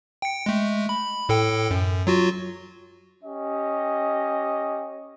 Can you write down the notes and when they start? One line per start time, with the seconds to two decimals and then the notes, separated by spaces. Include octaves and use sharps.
0.22 G5 C#7
0.46 G#3 A3
0.89 B5
1.29 A2 A4 G5
1.71 F#2
2.07 F#3 F4 F#4
3.22 C#4 G4 D#5